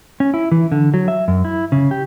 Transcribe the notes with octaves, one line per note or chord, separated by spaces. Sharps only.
C#4
E4
E3
D3
F#3
E5
F#2
E4
C#3
G4